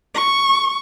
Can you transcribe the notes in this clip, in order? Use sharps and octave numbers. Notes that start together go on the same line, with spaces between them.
C#6